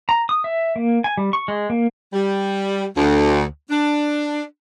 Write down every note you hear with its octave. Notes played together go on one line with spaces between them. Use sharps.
A#5
D#6
E5
A#3
G#5
G3
C#6
G#3
A#3
G3
D2
D4